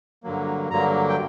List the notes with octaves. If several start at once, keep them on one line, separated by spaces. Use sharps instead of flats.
G2 D3 F#3 A#3
G2 D3 F#3 A#3 A#5
G5